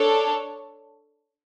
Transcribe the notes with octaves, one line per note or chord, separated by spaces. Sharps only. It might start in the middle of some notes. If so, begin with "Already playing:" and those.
Already playing: D4 A4 C#5